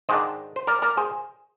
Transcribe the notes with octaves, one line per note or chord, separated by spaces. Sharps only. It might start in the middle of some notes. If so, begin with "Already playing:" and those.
G#2 D#3 G#3 D4 C5 D#5
C5
A#4 D5
A#4 D5
G#4 C5